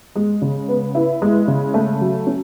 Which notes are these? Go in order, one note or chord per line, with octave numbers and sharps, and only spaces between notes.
G#3
C#3
B3
E4
G#3
C#3
A3
F#3
C#4